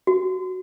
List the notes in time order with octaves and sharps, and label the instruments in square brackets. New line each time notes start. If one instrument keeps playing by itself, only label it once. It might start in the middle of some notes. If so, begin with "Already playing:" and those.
[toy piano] F#4